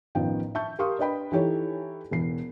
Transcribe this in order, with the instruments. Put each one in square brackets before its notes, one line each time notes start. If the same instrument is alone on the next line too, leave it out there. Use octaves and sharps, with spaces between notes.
[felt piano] A1 D#3 F3 B3 G5
E5 A5 C#6 G6
G4 A#4 F5 C6 C#6 D#6
D4 B4 D#5 G5 B5
E3 D#4 E4 G4 A4 C#5
E1 E3 C7